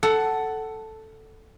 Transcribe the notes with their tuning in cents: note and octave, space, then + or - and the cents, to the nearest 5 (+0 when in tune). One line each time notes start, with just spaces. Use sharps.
A4 +0 F#5 +15